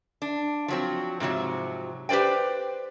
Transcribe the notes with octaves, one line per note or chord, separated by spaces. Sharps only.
D4
F3 F#3 C4
G#2 C3 F3 F#3
G4 B4 C5 D5 G5